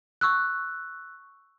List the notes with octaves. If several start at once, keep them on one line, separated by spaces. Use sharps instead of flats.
C#6 E6 F#6